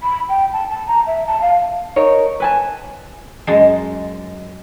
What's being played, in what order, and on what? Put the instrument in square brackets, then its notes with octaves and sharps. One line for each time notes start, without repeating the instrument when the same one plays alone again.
[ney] B5
G5
A5
A5
A#5
E5
A5
F5
[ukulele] D#4 A#4 C#5
B4 G#5 A5
[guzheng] F#2 G#3 D#5 A5 C6